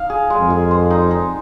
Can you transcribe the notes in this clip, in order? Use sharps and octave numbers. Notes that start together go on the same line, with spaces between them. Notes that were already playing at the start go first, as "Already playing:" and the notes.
Already playing: D#4 F5
G#4
G#3
F2
G#4
C5
D#4
D#4